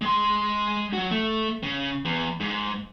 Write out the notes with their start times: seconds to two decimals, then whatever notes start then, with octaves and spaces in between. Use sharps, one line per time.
0.01 G#3 C6
0.93 F#3 F#4
1.11 A3
1.63 C#3
2.05 E2
2.40 G#2